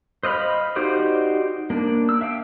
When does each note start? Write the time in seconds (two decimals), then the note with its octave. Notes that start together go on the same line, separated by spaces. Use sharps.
0.23 C5 D#5 F5 B5
0.76 D#4 F#4 G4 C5 D5
1.70 A#3 D4
2.09 E6
2.21 E5 F5 G5